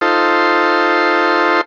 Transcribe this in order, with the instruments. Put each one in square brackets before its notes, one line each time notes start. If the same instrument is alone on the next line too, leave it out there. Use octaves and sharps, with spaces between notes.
[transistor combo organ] D#4 F4 A4 C5